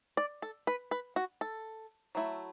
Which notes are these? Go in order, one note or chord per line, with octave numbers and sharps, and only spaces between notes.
D5
A4
B4
B4
F#4
A4
F#3 A3 E4